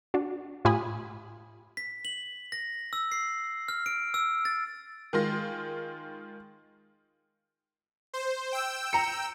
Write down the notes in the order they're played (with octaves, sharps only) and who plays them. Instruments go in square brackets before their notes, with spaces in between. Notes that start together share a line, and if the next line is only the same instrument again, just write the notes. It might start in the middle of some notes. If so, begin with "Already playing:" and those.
[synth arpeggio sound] D4 F#4
A2 F4 G4 G#5 B5 D#6
[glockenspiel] B6
F#7
A#6
E6
C7
F6
D7
E6
A6
[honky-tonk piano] D#3 G#3 F4 C6 A#6
[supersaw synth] C5
G5 E6
[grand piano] A#5 C#7